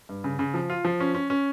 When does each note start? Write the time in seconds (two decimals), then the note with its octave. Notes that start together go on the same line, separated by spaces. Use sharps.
0.09 G2
0.24 C#3
0.39 C#3
0.54 F3
0.70 F4
0.85 F3
1.00 C#4
1.15 C#4
1.30 C#4